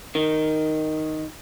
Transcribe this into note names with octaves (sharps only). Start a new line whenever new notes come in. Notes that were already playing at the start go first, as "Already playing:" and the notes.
D#3